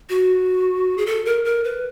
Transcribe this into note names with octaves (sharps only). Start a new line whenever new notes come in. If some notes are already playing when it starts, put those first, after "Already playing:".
F#4
G#4
A4
A#4
A#4
B4